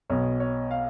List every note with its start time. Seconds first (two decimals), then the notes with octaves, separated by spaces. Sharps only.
0.10 B1 B2 C#5
0.40 C#5
0.71 F5